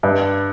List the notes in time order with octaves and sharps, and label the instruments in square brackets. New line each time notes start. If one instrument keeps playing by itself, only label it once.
[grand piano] G2